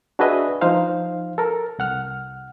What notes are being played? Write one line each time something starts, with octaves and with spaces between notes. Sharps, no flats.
D4 F#4 G#4 B4 D#5 E5
F3 D#4 C5 F5
A4 A#4
C2 F#5 F6